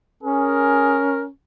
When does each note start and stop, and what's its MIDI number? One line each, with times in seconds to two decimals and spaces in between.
0.23 1.30 61
0.23 0.99 68
0.23 1.24 70